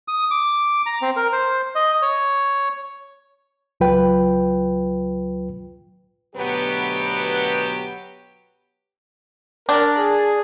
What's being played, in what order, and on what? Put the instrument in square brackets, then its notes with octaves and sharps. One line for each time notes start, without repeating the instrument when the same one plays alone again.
[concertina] D#6
D6
A#5
C4
A#4
C5
D#5
C#5
[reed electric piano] C#2 F#3 F4 B4 G5
[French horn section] D2 B2 F#3 B3 G4 B4
[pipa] D4 [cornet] A#4
[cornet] G#4